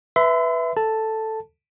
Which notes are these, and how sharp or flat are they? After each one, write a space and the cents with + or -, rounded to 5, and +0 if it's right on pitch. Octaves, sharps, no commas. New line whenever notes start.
B4 +0 E5 +0 C6 -45
A4 +0 A5 +0